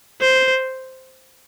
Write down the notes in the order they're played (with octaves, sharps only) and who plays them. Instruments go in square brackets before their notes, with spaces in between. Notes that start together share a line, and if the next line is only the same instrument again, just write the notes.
[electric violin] C5